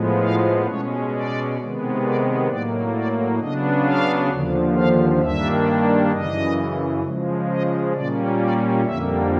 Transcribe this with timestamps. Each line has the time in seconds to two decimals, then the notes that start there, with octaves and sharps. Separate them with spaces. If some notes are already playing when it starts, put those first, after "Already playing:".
Already playing: A2 F3 G#3 B3
0.21 F5
0.67 B2 G#3 C#4 C#5
1.12 D5
1.58 C3 D#3 G#3 B3
2.03 D5
2.48 A2 F#3 A#3 D5
2.94 D5
3.39 C#3 F#3 B3 D4 D#5
3.85 F5
4.30 D#2 D3 F3
4.75 F5
5.21 G2 D#3 G3 A#3 D4 E5
6.12 F#2 C#3 E3 D#5
7.03 C#3 F3 G#3
7.49 D#5
7.94 A#2 G3 A#3 C#4 D5
8.39 D5
8.84 F2 D3 G3 A#3 E5